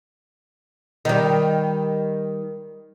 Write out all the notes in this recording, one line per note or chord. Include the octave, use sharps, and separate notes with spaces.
D#3 G3